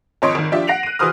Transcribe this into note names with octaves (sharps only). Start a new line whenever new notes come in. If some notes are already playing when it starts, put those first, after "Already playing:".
G#1 F2 C#5 D#5 C6 D7
G#1 D#3
F3 D4 F4 G4 E5 B6
F#5 A#6 C7 D7 F7 F#7
F#6 D#7
E3 F#4 G#4 C5 D#6 F6